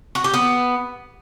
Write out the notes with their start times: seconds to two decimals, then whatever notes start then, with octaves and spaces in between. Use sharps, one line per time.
0.15 F#4
0.24 G4
0.34 B3